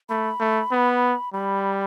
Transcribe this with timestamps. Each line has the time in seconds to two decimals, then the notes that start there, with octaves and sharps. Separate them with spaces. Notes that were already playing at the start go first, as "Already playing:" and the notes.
0.09 A3 B5
0.40 A3
0.71 B3
1.33 G3 B5